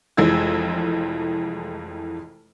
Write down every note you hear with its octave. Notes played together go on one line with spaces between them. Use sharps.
F1 F2 E3 G#3 E6 G#6